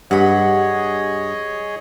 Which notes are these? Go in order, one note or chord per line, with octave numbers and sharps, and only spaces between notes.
G2 G#4 C#5 D#5 F#5 B5